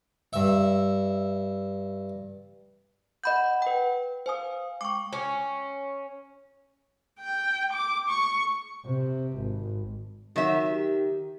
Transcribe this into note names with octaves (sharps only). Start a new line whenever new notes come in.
G2 E5
D#5 F#5 B5 G6
B4 G5
C5 F5 G#5 D#6
G#3 G5 C#6 D6
C#4
G5
D6
C#6
C3
G#1
D#3 F#3 E5
G4